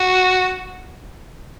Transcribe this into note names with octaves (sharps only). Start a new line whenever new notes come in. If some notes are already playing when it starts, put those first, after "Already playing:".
Already playing: F#4